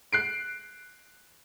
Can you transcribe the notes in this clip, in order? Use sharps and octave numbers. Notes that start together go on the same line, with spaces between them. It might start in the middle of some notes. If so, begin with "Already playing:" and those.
F#6 C7 D7